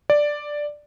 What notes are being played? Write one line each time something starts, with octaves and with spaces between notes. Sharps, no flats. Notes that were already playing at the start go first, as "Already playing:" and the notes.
D5